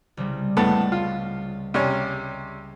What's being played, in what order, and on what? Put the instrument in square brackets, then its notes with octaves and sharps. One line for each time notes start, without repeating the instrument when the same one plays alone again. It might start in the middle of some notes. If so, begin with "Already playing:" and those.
[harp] C2 C#3 G3
[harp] C#2 [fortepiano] A2 B3 A4
[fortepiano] F4
C3 G3 C#4